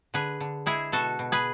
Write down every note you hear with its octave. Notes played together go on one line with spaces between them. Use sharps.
D3 G#4 B4
D3
G#3 E4 G#4
B2 F#4 A4
B2
G#4 B4